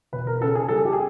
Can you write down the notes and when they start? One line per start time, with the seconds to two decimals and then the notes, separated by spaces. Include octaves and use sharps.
0.12 E1 B4
0.27 A#4
0.41 C#3 A4
0.55 G#4
0.69 G3 A4
0.77 G#4
0.85 G4
0.93 G#4